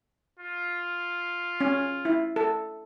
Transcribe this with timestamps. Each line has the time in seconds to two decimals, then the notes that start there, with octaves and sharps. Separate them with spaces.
0.39 F4
1.61 C#4
2.05 E4
2.36 A4